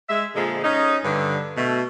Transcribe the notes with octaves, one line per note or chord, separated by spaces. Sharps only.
G#3 E5
A#2 D3 F3 G#3
C#4 D#4
G2 D3
B2 A3